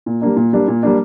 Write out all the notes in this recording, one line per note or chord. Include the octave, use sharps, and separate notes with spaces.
A#2
G3 A#3 D4
A#2
G3 A#3 D4
A#2
G3 A#3 D4